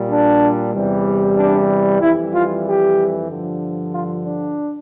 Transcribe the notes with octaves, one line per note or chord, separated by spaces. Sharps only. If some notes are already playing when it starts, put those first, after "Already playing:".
Already playing: A#2 G3
D4
E2 C3 E3 G3
D4
F2 E3 G3 E4
F4
G4
G2 D3 F3
F4
D4